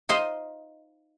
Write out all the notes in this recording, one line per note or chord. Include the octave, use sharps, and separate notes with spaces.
D#4 F4 C5 D#5